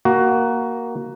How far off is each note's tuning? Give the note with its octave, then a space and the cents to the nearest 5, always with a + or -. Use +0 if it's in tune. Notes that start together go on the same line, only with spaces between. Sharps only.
A#3 +5 F#4 +15